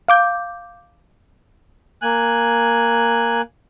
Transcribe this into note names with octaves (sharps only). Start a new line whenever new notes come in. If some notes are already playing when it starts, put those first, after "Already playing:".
F5 D6 G6
A#3 G#5 F#6